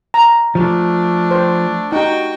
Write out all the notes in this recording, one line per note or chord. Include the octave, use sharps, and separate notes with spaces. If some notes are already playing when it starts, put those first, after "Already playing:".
A#5
F3 A3 D4
C5
D#4 F#4 G4 G5